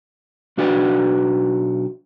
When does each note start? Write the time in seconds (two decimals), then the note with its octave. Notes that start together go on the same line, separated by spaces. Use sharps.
0.57 B1 D4 F#4 B4 D5 G5